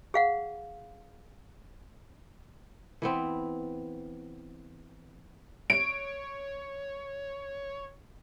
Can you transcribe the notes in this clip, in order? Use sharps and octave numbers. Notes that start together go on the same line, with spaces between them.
G#4 F5 F#5
E3 B3 C4
C#5 D7